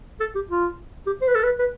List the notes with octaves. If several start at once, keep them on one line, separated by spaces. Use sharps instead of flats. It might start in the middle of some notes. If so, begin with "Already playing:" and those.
A4
G4
F4
G4
C5
B4
A4
B4
B4